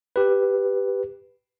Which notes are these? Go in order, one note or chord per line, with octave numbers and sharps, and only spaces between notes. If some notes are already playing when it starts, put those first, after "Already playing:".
G4 B4